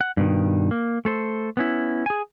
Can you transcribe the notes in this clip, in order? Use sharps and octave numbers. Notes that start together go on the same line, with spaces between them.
F#5
G2 B2 D#3
A#3
A3 A4 C5
B3 C#4 E4
G#4 G#5